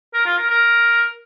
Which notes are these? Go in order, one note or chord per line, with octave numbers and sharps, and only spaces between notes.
A#4
F4
A#4
A#4